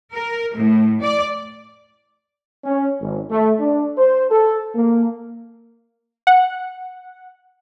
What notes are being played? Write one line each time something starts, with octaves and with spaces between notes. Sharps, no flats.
A#4
A2
D5
C#4
G#1
A3
D4
C5
A4
A#3
F#5